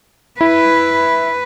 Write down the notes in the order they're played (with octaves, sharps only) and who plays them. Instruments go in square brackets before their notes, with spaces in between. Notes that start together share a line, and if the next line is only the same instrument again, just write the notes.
[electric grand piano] E4 [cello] B4